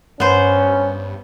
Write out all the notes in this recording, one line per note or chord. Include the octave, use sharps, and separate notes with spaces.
G2 B3 C#4 C5